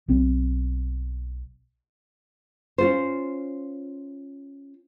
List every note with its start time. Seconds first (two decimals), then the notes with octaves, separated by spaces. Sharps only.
0.08 B1 C4
2.78 C#4 F4 C5